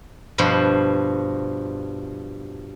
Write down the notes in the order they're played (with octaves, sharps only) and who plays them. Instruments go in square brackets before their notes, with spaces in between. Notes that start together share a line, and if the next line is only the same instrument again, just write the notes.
[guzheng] G2 B2 F3 C5